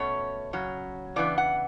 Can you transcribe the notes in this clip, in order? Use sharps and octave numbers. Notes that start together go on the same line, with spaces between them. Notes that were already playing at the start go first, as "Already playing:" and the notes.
Already playing: B2 A3 C#4 C#5
C#3 F#3 C#4
C#3 E3 B3 D4 D5
F#5